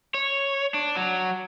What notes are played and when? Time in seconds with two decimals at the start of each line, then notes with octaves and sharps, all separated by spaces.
0.14 C#5
0.74 D4
0.97 F#3